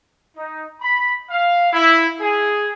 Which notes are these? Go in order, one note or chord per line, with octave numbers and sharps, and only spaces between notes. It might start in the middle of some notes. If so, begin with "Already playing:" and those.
D#4
B5
F5
E4
G#4